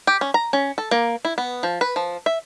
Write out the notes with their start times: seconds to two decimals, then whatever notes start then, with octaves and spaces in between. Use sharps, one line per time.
0.07 G4
0.21 C#4
0.34 A#5
0.53 C#4
0.78 A4
0.91 A#3
1.25 E4
1.38 B3
1.63 F3
1.81 B4
1.96 F3
2.26 E5